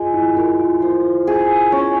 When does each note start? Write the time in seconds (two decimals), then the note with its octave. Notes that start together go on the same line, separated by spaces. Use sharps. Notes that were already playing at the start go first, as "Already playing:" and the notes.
Already playing: G#3 F4
0.14 E4
0.37 F4 A#4
0.60 F4
0.80 F4 C5
1.27 G#4
1.72 C#4